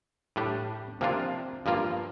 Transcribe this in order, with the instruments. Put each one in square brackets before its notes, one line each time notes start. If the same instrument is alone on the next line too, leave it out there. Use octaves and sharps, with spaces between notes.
[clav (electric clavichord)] A2 G3 D4 G4
C3 F3 A#3 D4 F4
G2 F3 A#3 F4